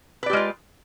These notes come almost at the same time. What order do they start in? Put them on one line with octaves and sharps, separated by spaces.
B4 D5 G4 G#3 F4